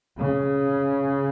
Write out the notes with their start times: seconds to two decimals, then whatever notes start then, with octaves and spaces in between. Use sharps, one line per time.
0.19 C#3